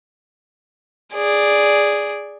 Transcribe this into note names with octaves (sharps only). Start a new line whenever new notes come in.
G#4 D5